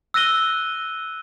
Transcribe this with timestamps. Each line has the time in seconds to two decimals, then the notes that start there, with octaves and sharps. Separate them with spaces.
0.14 E6 F#6 A#6 D#7 G7